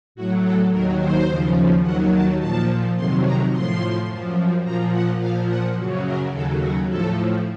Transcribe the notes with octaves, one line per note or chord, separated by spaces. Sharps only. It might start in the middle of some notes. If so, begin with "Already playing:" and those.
A2 F#3 F#4
A4
D#2 D#3 F#3 A#4
C5
D#2 C#3 F3
D#2 D#3 F#3 F#5
A5
A#2 F3 A5
F2 C3 D#3 F#3 C6
A#5
A2 F3 C6
F#2 F3
A#2 F3 A#5
F#5
A#2 F3 F5
F#5
F#2 C#3 F#3
A#4
D#2 C#3 F#3 A4
F#4
A2 F3 A4